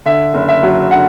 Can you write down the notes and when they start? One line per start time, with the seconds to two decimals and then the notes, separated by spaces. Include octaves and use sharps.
0.05 D3 E5
0.34 F#1
0.49 E5
0.63 F#3
0.91 D3 F#5